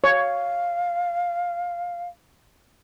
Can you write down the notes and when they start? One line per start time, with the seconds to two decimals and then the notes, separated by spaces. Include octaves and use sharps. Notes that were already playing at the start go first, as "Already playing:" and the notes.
0.04 C#5 F5